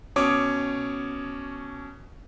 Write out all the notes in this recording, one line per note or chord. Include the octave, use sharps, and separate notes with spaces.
B2 C#4 C#5 D6 D#6